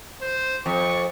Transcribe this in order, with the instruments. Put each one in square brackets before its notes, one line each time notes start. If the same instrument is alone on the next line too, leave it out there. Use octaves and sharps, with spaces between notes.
[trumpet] C5
[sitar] F2 [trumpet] C#6